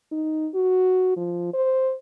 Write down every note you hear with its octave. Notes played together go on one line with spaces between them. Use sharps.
D#4
F#4
F3
C5